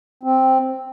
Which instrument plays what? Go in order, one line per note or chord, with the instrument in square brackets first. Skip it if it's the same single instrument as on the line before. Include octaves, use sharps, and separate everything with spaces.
[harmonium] C4